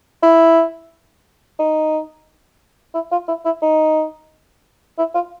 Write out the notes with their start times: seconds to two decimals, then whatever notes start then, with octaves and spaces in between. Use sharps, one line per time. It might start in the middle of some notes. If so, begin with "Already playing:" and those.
0.23 E4
1.59 D#4
2.94 E4
3.12 F4
3.28 E4
3.45 E4
3.62 D#4
4.98 E4
5.15 F4